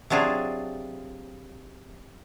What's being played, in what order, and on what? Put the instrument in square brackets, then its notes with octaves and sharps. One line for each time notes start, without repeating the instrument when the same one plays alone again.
[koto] C3 F#3 D4 F4 G#4